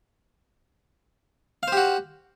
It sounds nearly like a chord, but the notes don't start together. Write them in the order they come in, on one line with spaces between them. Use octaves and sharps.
F5 C5 G4 F#4